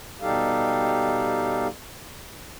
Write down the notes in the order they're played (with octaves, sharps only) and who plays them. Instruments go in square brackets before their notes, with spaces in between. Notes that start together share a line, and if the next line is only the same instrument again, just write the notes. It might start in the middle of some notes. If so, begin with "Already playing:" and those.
[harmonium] B2 G3 D#4 G4 A4 F5